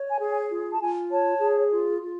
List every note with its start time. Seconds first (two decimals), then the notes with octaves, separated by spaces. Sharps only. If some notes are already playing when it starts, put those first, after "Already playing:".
Already playing: C#5
0.10 G#5
0.19 G#4
0.30 G#5
0.50 F4
0.72 A5
0.80 F4 G#5
1.10 C#5 A5
1.40 G#4
1.71 F4
2.01 F4